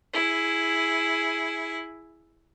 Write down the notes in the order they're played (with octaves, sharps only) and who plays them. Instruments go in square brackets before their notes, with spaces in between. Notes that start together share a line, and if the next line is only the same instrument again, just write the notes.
[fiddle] E4 G#4